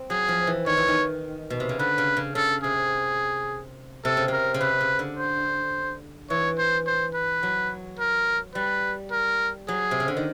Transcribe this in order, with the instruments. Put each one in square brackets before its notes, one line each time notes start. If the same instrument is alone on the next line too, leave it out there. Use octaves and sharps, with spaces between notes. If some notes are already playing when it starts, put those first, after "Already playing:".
Already playing: [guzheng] C4
[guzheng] F#3 [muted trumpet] G#4
[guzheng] F3
E3
[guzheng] D#3 [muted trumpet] C#5
[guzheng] E3
D#3
B2
C3
C#3
[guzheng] D3 [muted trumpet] B4
[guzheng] C#3
C#3
[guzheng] C#3 [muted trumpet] A4
[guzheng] C3 [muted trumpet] G#4
[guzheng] C3 [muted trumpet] A4
[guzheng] C#3
[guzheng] C3 [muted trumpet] A#4
[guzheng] C#3
[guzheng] C3 [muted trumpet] B4
[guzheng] C#3
D3
[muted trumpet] C5
[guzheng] E3 [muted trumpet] C#5
[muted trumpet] C5
C5
B4
[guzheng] F#3
[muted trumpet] A#4
[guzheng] G3 [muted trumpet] B4
[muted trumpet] A#4
[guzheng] F#3 [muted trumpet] G#4
[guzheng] C3
C#3
D3
D#3